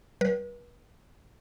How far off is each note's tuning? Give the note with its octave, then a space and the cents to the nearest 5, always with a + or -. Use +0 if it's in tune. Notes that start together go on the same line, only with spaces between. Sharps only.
G3 -35 B4 -40